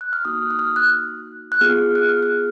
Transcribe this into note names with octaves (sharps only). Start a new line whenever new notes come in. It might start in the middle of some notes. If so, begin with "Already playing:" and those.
F#6
F6
A#3 D#4 F#4 D#6
D#6
F6
F#6
F#6
B3 F4 G#4 F6
F#6
F6
F#6